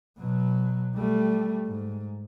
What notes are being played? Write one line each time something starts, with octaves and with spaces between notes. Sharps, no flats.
B2 F#3
G3 A3
G#2